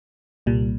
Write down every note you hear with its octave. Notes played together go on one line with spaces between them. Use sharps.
C2 A#2 G3